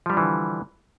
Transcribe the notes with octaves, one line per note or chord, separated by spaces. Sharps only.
D3 E3 F3 G3 D4